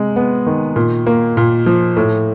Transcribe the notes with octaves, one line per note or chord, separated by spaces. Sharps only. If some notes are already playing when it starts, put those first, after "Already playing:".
Already playing: C3 G#3
B3
D#3
A#2
A#3
A#2
F3
A2